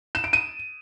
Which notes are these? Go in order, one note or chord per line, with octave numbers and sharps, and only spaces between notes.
E7
D7
D#7